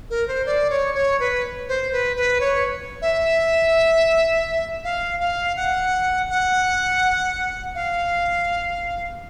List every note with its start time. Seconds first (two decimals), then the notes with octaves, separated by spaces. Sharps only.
0.10 A#4
0.28 C5
0.46 D5
0.70 C#5
0.95 C#5
1.20 B4
1.68 C5
1.92 B4
2.16 B4
2.40 C#5
3.02 E5
4.84 F5
5.20 F5
5.57 F#5
6.30 F#5
7.75 F5